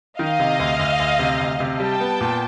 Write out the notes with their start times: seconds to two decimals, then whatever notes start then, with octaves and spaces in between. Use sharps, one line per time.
0.18 D#3 D#5 F5
0.39 C3
0.60 D2
0.79 D2
1.00 D2
1.19 C3
1.40 D2
1.60 C3
1.79 G3 G5 A5
2.01 B3
2.21 A#2